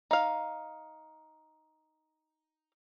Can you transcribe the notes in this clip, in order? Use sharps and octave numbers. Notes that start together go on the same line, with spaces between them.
D#4 F5